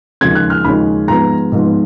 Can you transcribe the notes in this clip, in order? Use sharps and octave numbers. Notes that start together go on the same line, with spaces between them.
D#2 C#3 F3 G#3 C#4 G#6
F#6
F6
D#2 C#3 F3 G#3 C#4 B5
G#2 F3 G#3 B3 A#5
G#2 F3 G#3 B3